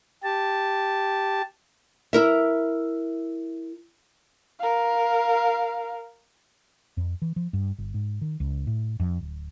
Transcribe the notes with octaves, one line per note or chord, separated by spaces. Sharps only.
G4 A5
E4 A#4 E5
A#4 F5
F2
E3
F3
G2
G1
G#2
D#3
C#2
A2
F2
D1